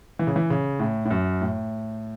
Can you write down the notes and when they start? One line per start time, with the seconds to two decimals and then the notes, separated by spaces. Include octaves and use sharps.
0.19 E3
0.27 C#3
0.36 E3
0.50 C#3
0.80 A2
1.05 A2
1.11 F#2
1.41 A2